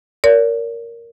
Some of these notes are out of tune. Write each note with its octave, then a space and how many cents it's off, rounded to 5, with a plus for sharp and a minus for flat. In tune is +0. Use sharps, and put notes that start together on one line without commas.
A#4 +0 D5 -45